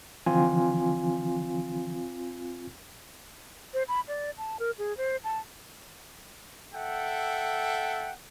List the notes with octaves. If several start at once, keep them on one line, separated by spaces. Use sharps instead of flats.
D3 E3 F3 C4 F4 G#5
C5
B5
D5
A5
A#4
G#4
C5
A5
A4 E5 F#5 G5